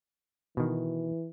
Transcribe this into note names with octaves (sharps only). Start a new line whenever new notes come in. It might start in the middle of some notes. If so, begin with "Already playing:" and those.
B2 D#3 E3